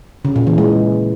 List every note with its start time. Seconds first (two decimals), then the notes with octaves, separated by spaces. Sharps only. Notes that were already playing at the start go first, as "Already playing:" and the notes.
0.25 C#3
0.36 A#2
0.47 E3
0.58 G#3